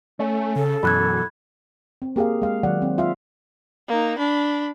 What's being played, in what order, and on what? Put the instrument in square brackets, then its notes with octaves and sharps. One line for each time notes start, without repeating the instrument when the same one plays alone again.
[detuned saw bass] A3 [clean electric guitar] C#4
[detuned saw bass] C#3 [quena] A4
[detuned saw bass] F#2 [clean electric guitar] B2 E3 F#3 [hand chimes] B5 F#6 G#6
[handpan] C4
A#3 G4 G#4 A#4 F5
G#3 F5
D#3 F#3 D5 F#5
C4
F4 E5 F5
[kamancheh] A#3 D#4
D4 B5